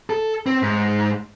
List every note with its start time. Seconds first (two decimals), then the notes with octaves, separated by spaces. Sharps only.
0.10 A4
0.46 C4
0.62 G#2